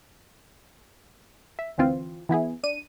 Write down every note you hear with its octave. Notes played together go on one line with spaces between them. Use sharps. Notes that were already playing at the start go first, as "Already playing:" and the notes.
E5
D2 E3 C4 F4
E3 B3 E4 G#4
D4 D#7